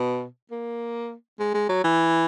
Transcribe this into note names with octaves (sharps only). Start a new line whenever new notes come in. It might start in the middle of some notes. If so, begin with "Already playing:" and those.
Already playing: B2
A#3
G#3
G#3
F#3
E3